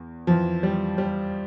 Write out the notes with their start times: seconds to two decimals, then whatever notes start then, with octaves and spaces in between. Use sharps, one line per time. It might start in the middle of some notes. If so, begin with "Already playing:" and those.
Already playing: E2
0.27 F2 E3 F3
0.63 G3
0.98 G3